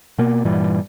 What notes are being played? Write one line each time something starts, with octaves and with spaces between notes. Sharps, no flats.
B2 A#3
G2 A#2 E3 G3